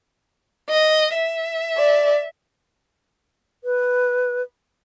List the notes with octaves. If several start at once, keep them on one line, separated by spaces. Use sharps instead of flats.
D#5
E5
D5
B4